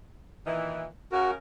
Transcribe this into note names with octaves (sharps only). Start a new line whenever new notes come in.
A#2 D#3 E3
C#3 F#4 A#4